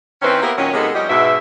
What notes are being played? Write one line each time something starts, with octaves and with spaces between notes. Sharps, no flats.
D#3 C4 C#4 E4 B4 C5
A#3 B3 E4 G4 A#4
A#2 D#3 F#3 C#4
C3 G#3 A#3 B3 D#4 A4
F3 G3 C#4 G4 D#5
G#2 B2 E5